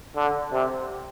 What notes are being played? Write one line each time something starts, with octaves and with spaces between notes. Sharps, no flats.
D3
C3